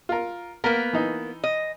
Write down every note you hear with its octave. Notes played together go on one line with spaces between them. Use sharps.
F4 A#4
A#3 B3 A#4
E3 D#4
D#5